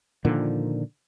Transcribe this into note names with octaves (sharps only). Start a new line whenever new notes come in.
A#2 D3 D#3 F3